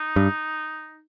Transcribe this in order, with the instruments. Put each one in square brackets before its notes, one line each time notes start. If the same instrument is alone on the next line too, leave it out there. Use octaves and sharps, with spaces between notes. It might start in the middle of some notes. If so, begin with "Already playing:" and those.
Already playing: [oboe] D#4
[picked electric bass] G2